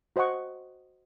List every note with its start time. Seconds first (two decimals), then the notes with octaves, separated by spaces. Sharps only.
0.16 F#4 C5 D#5 F#5 C#6